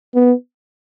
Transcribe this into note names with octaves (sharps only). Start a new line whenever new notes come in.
B3